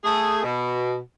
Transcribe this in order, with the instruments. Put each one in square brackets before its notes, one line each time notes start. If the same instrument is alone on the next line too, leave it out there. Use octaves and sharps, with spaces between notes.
[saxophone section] A3 G#4
B2